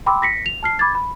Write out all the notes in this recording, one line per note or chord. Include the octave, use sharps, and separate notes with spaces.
G5 B5 C6 D6 E6
A#6 B6 C#7
F7
A5 F6 C7
B5 D6 G#6 A6
B5